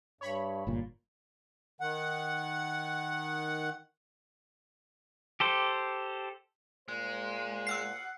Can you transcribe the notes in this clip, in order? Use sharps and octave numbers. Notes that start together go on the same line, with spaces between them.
G2 C#5 B5
G1 A#2
D#3 F#5
G4 A4 C5
A#2 G#3 C5
F#5 E6 F6 C7